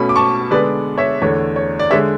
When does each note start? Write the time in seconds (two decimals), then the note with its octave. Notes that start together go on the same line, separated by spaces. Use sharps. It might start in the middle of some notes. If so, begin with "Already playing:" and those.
Already playing: B2 A3 C#4 B5
0.09 D6
0.16 A5 C#6
0.51 D3 G#3 B3 B4 D5
0.98 C#5 E5
1.22 E2 D3 A3 C#5
1.56 C#5
1.79 D5
1.91 D3 G#3 C#5 E5